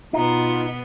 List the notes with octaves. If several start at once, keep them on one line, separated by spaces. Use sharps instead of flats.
B2 B3 D#4 F4